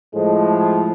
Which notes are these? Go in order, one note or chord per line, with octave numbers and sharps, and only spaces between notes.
A2 F3 G#3